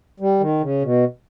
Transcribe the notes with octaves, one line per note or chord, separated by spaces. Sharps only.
G3
D#3
C#3
B2